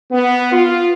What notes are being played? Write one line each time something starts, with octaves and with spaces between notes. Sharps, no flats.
B3
F4